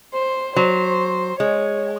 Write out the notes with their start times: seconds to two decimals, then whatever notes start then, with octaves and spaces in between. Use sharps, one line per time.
0.14 C5
0.56 F#3 C5
1.39 G#3 C#5